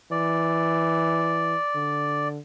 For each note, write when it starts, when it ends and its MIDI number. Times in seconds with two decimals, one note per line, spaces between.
0.11 1.55 52
0.11 2.28 74
1.75 2.39 50